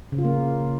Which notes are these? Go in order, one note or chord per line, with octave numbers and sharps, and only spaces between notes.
C#3
F4
A#3